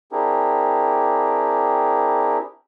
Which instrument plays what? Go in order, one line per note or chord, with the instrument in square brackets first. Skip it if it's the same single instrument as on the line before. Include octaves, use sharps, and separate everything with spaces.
[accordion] C4 D4 E4 G4 G#4 A#4